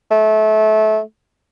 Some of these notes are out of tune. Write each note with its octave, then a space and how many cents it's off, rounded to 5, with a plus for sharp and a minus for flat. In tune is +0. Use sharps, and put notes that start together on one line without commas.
A3 -25